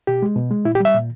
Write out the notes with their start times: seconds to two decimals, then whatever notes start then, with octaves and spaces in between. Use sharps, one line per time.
0.07 B2 G4
0.22 G#3
0.36 B2
0.51 G#3
0.65 A#2 E4
0.75 G4
0.80 G3 E5
0.94 A#2